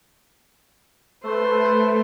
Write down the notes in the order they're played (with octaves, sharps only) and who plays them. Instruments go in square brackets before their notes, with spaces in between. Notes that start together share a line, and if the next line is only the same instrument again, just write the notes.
[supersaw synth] A3 [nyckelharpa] B4 C5